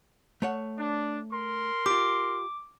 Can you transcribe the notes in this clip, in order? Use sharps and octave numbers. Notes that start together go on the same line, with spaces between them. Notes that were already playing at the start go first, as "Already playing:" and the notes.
A3 C#5 F#5
D4
A#4 C6
F4 G4 D6